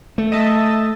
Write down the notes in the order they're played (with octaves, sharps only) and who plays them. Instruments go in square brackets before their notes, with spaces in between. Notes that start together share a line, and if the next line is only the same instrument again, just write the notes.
[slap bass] A3
[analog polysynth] D#5 E5 A5